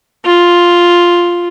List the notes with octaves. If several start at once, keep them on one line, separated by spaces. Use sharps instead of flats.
F4